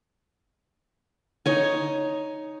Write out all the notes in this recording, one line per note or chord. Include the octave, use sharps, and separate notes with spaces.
D#4 C#5 G#5